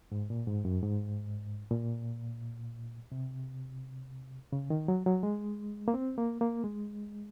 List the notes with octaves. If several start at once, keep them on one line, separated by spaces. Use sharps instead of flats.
G#2
A#2
G#2
F#2
G#2
A#2
C3
C#3
D#3
F#3
F#3
G#3
A#3
C4
A#3
A#3
G#3